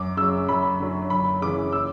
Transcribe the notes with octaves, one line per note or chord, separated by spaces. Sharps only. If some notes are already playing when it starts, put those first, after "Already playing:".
Already playing: F#2 D6
C#3 F#3 E6
F#2 B5
D3 F#3
F#2 B5
C#3 E3 D6
E6